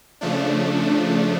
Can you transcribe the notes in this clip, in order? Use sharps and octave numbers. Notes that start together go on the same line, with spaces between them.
C#3 F3 A3 D4